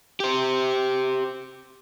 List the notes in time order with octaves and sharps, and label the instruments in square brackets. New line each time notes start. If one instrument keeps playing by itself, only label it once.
[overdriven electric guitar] G4 C5